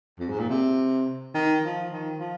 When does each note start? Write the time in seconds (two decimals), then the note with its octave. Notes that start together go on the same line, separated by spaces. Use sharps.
0.19 F2
0.29 G#2
0.40 A#2
0.50 C3
1.34 D#3
1.63 F3
1.91 D#3
2.19 F3